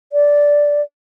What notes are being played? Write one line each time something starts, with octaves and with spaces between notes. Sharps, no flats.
D5